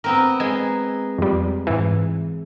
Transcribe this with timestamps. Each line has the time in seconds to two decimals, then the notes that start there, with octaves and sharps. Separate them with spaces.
0.04 B3 C4 A#4
0.40 G#3 G#5
1.18 F2 G3
1.67 G#2 E3